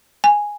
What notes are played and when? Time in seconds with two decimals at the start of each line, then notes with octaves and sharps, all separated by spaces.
0.24 G#5